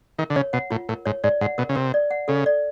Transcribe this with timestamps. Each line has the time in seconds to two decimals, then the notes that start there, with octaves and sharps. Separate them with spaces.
0.18 D#3 A#4
0.30 D3
0.36 C#3 C#5
0.53 B2 F#5
0.70 A2 F4
0.89 A2 A#4
1.05 G#2 C#5
1.23 G#2 D5
1.41 G#2 F#5
1.58 B2 A#4
1.69 C#3
1.75 C3 A#4
1.94 D5
2.11 F#5
2.28 C#3 A4
2.46 D5